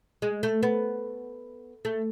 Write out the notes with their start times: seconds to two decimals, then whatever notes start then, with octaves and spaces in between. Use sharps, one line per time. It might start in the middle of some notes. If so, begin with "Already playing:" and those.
0.22 G#3
0.43 A3
0.63 B3
1.85 A3